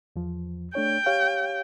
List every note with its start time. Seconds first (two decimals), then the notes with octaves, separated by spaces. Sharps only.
0.16 E2 F3
0.75 A3 D4 C#5 G5
1.06 G4 C#5 F5